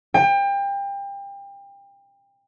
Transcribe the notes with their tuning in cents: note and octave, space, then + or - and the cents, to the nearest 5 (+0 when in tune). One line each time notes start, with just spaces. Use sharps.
G5 +30